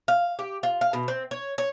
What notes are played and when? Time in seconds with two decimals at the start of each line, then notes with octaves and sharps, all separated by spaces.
0.08 F5
0.39 G4
0.63 F4
0.81 F5
0.93 B2
1.08 C4
1.31 C#5
1.58 C#5